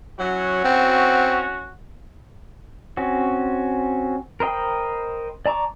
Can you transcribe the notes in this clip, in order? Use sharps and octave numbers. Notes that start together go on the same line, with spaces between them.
F#3 C#4 E4 F#4
C4
C4 C#4 F#4
A#4 C5 D#5 G5 B5
D5 A5 A#5 C#6 D6